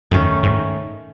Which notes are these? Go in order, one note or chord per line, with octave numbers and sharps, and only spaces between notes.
F#2 D#3 A3 C#4
G#2